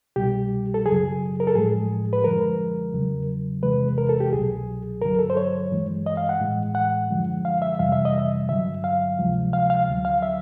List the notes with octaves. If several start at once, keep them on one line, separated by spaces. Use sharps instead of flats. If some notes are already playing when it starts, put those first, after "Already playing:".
C2 B2 G3 G4
A4
F#2 C#3 F#3 G#4
A#4
A4
A2 F3 G#3 G#4
B4
F#2 D3 F3 G#3 A#4
E2 C#3 F#3
E2 C3 E3 G#3 B4
A#4
A4
G4
C2 B2 F#3 G#4
G2 D3 F#3 A#4
A4
C5
C#5
G2 E3 G#3
D#5
F5
F#5
A2 E3 G#3
F#5
F#2 D3 F3 G#3
F5
E5
F2 C3 E3 G3 F5
E5
D#5
E5
G2 D3 F#3 E5
F5
D2 C3 F3 G#3
F5
F5
D2 D3 F#3
F5
E5